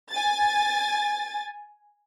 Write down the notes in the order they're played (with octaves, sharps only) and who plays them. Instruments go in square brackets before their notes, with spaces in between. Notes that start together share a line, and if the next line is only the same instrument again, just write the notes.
[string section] G#5 A6